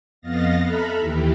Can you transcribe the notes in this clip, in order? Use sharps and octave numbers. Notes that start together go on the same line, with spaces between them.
F2 B3 D#5 F5 A6 A#6
A4 E5 A#5 B5 F6 F#6
D#2 E3 G4